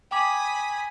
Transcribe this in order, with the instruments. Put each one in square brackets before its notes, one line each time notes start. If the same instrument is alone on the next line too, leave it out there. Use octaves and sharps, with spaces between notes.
[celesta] G5 D6 [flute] G#5 [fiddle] B5 D#6